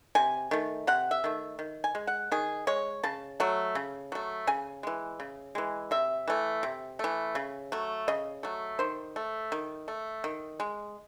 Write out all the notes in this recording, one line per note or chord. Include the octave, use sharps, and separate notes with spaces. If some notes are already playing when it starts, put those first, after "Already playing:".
C3 G#5
D#3 A3
C3 F#5
E5
D#3 A3
D#3
G#5
G#3
F#5
D#3 G#4
G#3 C#5
C#3 A5
F#3 A3
C#3
F#3 A3
C#3 G#5
E3 G#3
C#3
E3 G#3
C3 E5
E3 A3
C3
E3 A3
C#3
F#3 A3
C#3 D#5
F#3 A3
D#3 C5
A3
D#3
A3
D#3
G#3